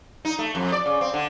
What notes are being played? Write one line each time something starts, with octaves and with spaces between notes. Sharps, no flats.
D#4
A3
F2
D5
C#3
C4
D3